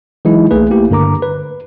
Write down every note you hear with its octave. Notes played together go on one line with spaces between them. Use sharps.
E3 F#3 G#3 D#4 E4
B1 A3 A#3 G#4 B4
A3 A#3 E4 G4
G2 D3 A#4 A#5 D6
B4